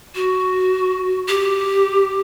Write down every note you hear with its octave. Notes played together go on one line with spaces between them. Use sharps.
F#4
G4